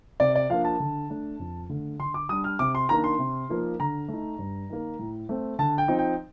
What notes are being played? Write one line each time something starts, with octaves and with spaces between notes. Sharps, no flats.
C3 D5
D5
F3 A#3 D4 F5
A5
D3
A3 D4
F2
D3 A3
D3 C6
D6
G3 D4 D#6
F6
C3 D6
C6
D#3 A#3 D4 A#5
C6
C3
F3 A#3 D#4
D3 A#5
A3 D#4
G2
D#3 A#3
A2
A3 C4
D3 A5
G5
F3 C4 D#4
G5